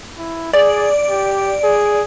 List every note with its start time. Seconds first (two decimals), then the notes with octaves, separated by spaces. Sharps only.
0.18 E4
0.53 G#4 D5
1.10 G4
1.64 G#4